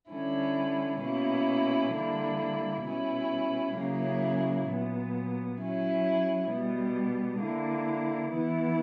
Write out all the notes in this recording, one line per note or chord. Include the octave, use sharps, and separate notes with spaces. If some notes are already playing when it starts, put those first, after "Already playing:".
D3 G3 C#4 E4
B2 A#3 C#4 E4
D3 G3 A#3 E4
B2 G3 C#4 E4
C#3 F#3 A#3 C#4 E4
A#2 F#3 B3
F#3 C#4 E4
B2 G3 B3
D3 A#3 E4
E3 B3 E4